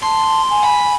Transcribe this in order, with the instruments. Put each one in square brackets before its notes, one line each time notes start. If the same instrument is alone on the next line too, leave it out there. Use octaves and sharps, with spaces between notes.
[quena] A5 [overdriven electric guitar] C6
[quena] G#5
[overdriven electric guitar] B5